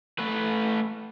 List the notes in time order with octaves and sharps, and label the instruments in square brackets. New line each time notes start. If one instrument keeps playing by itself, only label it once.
[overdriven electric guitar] A3 B4